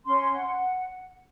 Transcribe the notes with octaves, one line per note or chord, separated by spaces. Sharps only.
C#4 C6
F#5